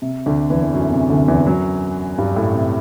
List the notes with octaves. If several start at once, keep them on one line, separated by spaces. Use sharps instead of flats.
C3
D2 D3
E2 E3
E3
F#2 F#3
C3
D2 D3
E2 E3
F#2 F#3
G2 G3
A2 A3
C3